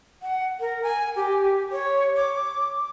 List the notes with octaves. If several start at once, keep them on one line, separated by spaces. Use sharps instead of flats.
F#5
A#4
G#5
G4
C#5
D6